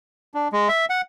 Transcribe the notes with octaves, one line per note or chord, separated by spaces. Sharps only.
D4
G#3
E5
F#5